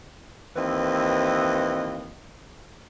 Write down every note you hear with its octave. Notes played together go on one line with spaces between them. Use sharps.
D#2 E3 C4 B4 D#5